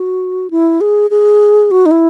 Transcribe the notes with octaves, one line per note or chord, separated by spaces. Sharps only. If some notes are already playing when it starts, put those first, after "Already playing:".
Already playing: F#4
E4
G#4
G#4
F#4
D#4
E4